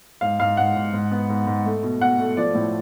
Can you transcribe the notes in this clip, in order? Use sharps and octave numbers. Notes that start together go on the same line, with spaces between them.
G#2 F5
G#2 F5
G#2 F#5
G#2
G#2
B3
G#2
G#2
A3
B2
B2 F#5
A3
F3 D5
A2